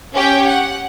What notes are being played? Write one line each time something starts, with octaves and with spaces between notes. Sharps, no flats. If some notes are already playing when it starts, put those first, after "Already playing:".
C#4 G4 C#5 G5
F#5